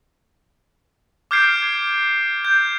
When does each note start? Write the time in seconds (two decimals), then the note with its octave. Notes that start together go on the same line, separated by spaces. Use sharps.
1.31 D6 F6 G6 G#6 C7 D7
2.45 G6